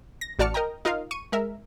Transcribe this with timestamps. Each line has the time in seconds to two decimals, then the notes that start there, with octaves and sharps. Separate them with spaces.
0.21 A#6
0.39 A1 F#4 D5 A5 F6 C#7
0.54 A#4 D#5 G5 A#5
0.85 D#4 F4 A#4 D#5 F5
1.11 C#6 D#7
1.32 G#3 A#4 E5